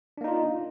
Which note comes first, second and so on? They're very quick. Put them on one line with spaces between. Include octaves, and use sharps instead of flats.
D4 A#3 D#4 F4